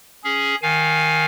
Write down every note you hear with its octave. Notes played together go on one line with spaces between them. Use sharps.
C#4 G#4
D#3 F5 G#5